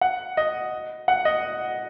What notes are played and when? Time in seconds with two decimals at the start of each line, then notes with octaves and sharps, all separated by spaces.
0.01 F#5
0.37 D#5
1.08 F#5
1.25 D#5